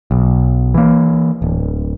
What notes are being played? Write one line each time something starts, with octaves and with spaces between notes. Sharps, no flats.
B1
E3 A#3
D1